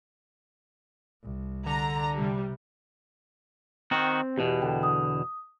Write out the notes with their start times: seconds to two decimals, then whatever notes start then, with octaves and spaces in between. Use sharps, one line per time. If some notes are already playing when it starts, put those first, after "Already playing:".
1.23 C2
1.66 D3 A#5
2.17 C3 G3
3.91 D#3 C4 F#4
4.38 E2 B2 G4
4.62 D3 G5
4.83 D#6